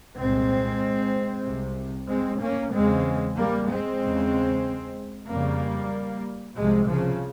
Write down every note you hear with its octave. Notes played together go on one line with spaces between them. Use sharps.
C2 A#2 G#3 C4
C2 C3
G#3 C4
A#3 C#4
E2 C#3 G#3 C4
G3 A#3
G#3 C4
E2 C#3
F2 C#3 G3 A#3
C2 C3 F3 G#3
C#3 F3